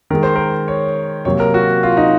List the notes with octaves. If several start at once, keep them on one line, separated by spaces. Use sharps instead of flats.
D#3 G#3 A#4
C5
A#4
C#5
C3 F#3 A#3 C#5
A#4
F#4
F4
D#4